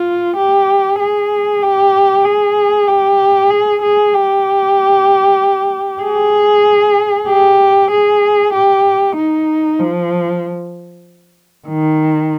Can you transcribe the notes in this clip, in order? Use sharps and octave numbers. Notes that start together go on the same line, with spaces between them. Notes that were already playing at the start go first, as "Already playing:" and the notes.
Already playing: F4
G4
G#4
G4
G#4
G4
G#4
G#4
G4
G#4
G4
G#4
G4
D#4
F3
D#3